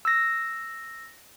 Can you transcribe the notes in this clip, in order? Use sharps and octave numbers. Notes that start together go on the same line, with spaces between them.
E6 A#6